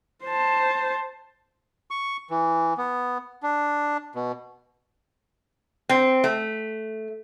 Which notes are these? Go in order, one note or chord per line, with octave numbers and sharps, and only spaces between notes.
C5 A5
C#6
E3
B3
D4
B2
C4
A3